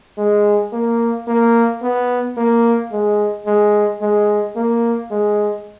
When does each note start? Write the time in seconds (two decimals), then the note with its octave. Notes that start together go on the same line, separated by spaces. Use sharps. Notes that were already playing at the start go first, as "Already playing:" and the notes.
0.18 G#3
0.73 A#3
1.28 A#3
1.82 B3
2.37 A#3
2.92 G#3
3.46 G#3
4.01 G#3
4.56 A#3
5.11 G#3